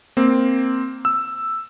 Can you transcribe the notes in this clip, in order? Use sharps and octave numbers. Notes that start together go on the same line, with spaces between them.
A#3 C4
E6